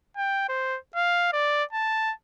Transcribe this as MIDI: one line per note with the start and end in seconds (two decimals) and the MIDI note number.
0.17 0.47 79
0.49 0.78 72
0.96 1.29 77
1.33 1.64 74
1.73 2.13 81